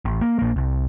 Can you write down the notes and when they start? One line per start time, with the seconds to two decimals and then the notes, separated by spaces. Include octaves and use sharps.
0.05 A1
0.21 A#3
0.39 A#1 A#3
0.56 C2